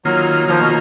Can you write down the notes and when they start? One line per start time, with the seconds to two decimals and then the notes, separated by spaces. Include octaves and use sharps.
0.05 D#3 F#3 A#3 F4
0.48 D#3 F3 A#3 F4
0.59 B2